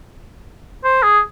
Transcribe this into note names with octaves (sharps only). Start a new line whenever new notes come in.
C5
G#4